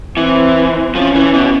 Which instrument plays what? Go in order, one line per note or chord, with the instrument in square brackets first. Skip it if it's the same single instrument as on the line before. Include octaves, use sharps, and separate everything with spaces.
[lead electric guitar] E3 [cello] C4
[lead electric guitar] F3 [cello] C#4
[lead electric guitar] E3
B2